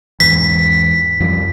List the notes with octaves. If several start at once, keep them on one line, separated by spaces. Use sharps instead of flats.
E2 G#2 E3 B6
F2 F3 G3